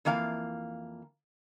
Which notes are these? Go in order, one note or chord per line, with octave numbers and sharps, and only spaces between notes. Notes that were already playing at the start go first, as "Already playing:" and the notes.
F2 E3 A#3 F5